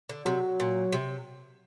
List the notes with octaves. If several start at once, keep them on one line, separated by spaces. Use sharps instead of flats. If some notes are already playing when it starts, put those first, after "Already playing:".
D3
C3 F#3
A#2
C3